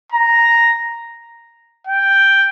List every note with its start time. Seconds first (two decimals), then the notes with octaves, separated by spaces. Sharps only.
0.13 A#5
1.87 G5